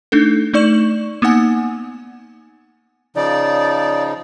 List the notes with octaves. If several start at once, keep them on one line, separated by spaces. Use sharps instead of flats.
A3 D4 D#4 A4
A3 D#4 D5 C#6 E7 F#7
A#3 B3 D#4 F#5 G#5
C#3 F3 D#4 D5